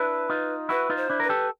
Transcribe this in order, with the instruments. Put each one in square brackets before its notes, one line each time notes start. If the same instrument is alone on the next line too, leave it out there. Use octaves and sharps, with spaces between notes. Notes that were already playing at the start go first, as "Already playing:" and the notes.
Already playing: [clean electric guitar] D4 E4 [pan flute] B4
[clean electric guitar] D#4 F4
[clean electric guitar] E4 F#4 [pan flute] B4
[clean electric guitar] D#4 F4
[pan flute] C5
[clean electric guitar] D4 E4
[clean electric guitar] A#4 [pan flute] B4
[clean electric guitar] G4 A4